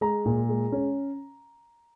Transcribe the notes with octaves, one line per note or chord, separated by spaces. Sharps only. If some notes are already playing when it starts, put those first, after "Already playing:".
G#3 A#5
A#2
G#3
C#4